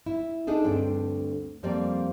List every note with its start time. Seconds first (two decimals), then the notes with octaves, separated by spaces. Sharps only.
0.06 E4
0.47 D4 D#4 G#4 A4
0.64 D2 G2 C4 D4 G5
1.63 F2 F3 G3 A#3 C4 D5